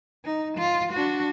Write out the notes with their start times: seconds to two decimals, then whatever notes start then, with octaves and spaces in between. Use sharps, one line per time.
0.25 D#4
0.57 F4
0.93 D4 F#4